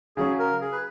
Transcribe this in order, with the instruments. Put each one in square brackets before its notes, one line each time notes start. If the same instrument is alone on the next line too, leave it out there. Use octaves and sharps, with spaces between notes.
[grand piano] C#3 F#3 C#4 [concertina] G#4
[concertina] A#4
G#4
B4